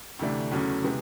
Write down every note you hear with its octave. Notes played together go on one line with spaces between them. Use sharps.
D2 C3 E3 A3 D4
E2 C#3 F#3 A3 C#4
C3 E3 G#3 B3